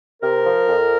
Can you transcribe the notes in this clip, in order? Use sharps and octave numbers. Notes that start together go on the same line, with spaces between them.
C3 A#4
F3
F2